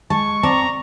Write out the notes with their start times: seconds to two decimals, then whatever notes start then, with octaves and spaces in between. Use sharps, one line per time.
0.10 G#3 A5 C#6
0.43 C4 D5 A5 A#5